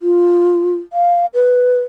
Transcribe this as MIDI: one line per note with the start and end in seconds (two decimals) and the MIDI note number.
0.01 0.75 65
0.93 1.26 77
1.34 1.80 71